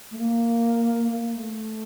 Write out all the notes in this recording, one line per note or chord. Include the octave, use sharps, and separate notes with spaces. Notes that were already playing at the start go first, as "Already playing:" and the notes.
A3
A#3
A#3
A3